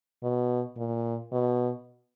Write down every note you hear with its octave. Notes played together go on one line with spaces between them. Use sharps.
B2
A#2
B2